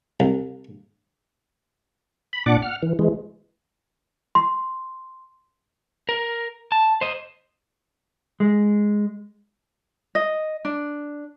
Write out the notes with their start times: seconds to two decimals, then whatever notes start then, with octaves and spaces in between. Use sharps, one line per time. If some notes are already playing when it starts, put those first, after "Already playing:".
0.20 C2
2.33 B5
2.46 A#2 D4 D5 F#5 D6
2.62 F#5 F6
2.83 E3
2.99 E3 G#3
4.35 C6
6.09 A#4
6.72 A5
7.01 C5 D#5
8.40 G#3
10.15 D#5
10.65 D4